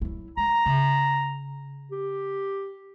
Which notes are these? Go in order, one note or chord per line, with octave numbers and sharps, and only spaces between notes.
F#3 E4
G#3 A#5
C#3
G4